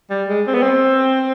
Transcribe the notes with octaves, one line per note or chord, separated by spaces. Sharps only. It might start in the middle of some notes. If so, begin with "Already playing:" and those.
G3
G#3
C4
B3
C4